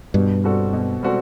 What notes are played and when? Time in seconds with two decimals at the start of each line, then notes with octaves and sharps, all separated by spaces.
0.14 G2 B2
0.44 G3 C4 F#4 A4
0.73 B2
1.03 G3 C4 F#4 A4